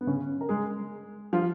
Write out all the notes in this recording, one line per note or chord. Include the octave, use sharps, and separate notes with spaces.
B3
C#3 C#4
A#4
G#3 G#4
F3 F4